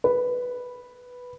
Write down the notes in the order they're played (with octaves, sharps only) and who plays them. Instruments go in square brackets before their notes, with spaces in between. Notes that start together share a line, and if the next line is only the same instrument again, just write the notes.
[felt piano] B4